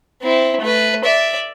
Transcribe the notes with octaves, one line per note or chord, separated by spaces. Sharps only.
C4 E4
A3 B4
D5 E5